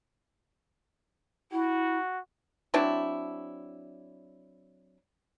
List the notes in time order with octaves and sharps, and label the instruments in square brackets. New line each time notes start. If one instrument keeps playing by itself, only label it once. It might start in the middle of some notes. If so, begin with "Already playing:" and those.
[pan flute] E4 [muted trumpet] F#4
[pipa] F#3 C4 D4 E4